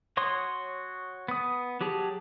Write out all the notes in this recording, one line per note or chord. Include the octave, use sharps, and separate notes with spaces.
F#4 C#5 C6 D#6
B3 D#6
F#3 G4 G#4 A5